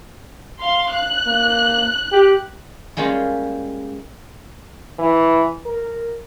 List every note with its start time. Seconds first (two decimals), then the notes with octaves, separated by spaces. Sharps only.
0.60 F5 C6
0.91 F#6
1.27 A#3
2.12 G4
2.97 G3 G#3 A#3 C#4 F4
4.99 E3
5.66 A#4